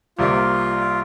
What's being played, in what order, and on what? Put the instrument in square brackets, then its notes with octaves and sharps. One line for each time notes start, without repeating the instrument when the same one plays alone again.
[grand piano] C2 C3 G3 A#3 [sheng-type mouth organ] F4